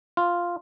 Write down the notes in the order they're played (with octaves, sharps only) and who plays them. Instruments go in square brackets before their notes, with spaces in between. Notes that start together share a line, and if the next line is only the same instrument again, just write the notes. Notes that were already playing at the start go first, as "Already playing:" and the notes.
[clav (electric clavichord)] F4